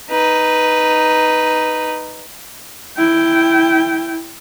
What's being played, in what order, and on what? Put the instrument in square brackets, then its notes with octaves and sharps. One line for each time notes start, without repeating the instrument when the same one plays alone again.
[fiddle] D#4 B4
[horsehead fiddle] E4 G5